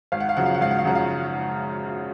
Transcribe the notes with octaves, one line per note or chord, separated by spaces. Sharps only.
G#1 F5
F#5
F5
F#2 C#3 F3 F#5
F5
F#5
G#1 F5
F#5
F5
F#2 C#3 F3 F#5
F5